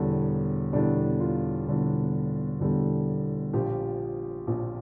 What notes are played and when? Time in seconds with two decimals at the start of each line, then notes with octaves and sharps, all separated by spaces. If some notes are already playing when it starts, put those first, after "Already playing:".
Already playing: E1 E2 D3 G3
0.73 E1 E2 D3 G3 D4
1.20 F4
1.67 E1 E2 D3 G3
2.59 E1 E2 D3 G3
3.53 A#1 A#2 F3 G4
4.47 A#1 A#2 F3